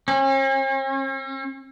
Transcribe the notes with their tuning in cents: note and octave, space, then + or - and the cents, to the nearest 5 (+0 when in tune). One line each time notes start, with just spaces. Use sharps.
C#4 -45